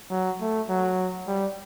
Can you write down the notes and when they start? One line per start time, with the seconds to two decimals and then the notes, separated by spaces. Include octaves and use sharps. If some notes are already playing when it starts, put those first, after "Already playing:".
0.10 F#3
0.41 A3
0.69 F#3
1.27 G3